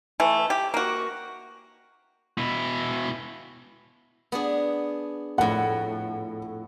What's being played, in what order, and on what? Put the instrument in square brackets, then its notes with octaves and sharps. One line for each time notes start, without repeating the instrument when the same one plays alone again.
[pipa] E3 A3
G4
A#3 F#4
[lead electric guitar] B2 E4
[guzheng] B3 D4 G#4
[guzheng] F2 A2 [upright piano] F#5